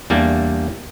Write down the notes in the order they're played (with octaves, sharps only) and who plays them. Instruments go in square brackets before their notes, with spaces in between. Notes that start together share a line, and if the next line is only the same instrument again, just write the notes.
[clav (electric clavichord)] E2 G3 A#3 D4